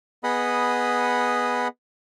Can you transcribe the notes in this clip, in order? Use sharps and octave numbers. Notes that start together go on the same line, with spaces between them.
B3 G#4 D#5 F#5 B5 D#6